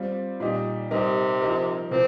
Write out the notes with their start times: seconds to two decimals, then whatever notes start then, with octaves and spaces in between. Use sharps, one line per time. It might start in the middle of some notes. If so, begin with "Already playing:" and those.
Already playing: G3 C4 F4
0.40 A#2 G3 D#4 G4
0.91 C3 G3 D#4 G4 A#4
1.41 F3 D#4 A#4
1.91 C3 F3 C4 A#4